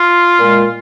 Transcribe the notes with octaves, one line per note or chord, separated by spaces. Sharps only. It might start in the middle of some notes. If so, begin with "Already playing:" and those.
Already playing: F4
A#2 G#3